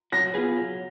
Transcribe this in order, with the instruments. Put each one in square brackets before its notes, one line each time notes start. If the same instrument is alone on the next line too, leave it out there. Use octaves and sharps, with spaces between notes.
[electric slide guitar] F#3 [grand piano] A#6
[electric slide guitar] B3 F4 G#4 B4
F#3